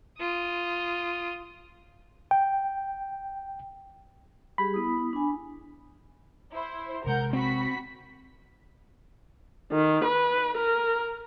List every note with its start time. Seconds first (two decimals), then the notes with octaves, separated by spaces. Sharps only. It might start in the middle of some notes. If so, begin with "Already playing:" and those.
0.19 F4 D#6
2.31 G5
4.58 G3 G4 G#4 B5
4.74 B3 E4 D#6
5.13 D4 G#5
6.53 E4 C5
7.04 A#1 C3 G#3 A#4 F#5 G6
7.33 C4 F#4 B5 B6
9.72 D#3
10.04 B4
10.57 A#4